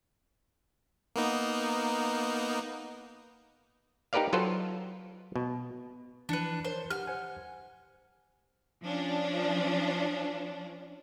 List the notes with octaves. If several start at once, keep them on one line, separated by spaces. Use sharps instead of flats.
A#3 B3 D#4
D#4 G4 A#4 B4 D5 F5
F#3 F4 A4 B4 C5
B2
E3 F3 D4 B4 C#7
A#4 C5 C#5
G4 F#5 F6
C5 F#5 G#5
F3 C#4 D4